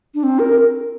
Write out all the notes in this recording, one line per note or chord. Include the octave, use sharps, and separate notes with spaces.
D4
C4
A#4